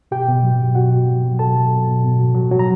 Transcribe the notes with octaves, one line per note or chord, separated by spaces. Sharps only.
B2 G4 G5
B2
F#3
B2
B2 F#4 F#5
B2
F#3
F#3
B2 A4 A5
F#3
B2
B2
B2
F#3
F#3
F#3
A#5